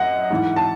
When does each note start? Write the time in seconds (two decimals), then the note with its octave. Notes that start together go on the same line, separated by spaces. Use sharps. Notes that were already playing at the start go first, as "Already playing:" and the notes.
Already playing: F#2 D#5 F#5
0.30 G#2 E3
0.56 A5